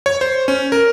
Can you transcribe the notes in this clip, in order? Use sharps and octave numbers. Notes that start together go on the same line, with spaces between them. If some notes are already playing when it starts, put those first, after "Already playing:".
C#5
C5
C#4
A#4